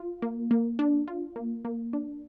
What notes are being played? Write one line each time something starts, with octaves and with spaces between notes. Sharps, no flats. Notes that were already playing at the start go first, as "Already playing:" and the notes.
Already playing: F4
A#3
A#3
D4
F4
A#3
A#3
D4